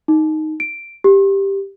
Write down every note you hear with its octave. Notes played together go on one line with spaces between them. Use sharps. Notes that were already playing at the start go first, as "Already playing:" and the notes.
D#4
D7
G4